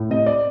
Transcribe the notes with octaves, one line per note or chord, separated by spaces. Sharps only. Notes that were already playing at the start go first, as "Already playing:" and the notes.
Already playing: A2
C3 D#5
D5